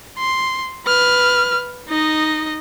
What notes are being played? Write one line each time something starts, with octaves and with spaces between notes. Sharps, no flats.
C6
B4 F6
D#4 D#5